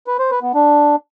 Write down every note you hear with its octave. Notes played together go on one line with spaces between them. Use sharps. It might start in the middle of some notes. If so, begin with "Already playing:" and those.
B4
C5
B4
B3
D4